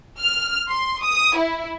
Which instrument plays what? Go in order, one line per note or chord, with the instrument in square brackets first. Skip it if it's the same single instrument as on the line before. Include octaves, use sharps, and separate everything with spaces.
[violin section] F6
C6
D#6
E4